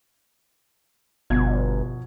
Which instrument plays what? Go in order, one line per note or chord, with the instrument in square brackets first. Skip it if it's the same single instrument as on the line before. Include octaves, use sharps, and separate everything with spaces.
[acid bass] G1 [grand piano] B2 F3 G#6